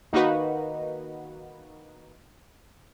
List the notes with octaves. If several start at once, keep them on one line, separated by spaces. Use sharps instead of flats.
D#3 A#3 D#4 F#4 B4